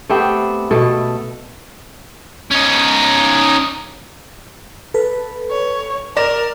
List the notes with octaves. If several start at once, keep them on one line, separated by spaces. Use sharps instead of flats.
A3 B3 C4 G4
B2 A3 A4
C#4 D#4
A4 B4
C#5
A#4 D5 A#6 E7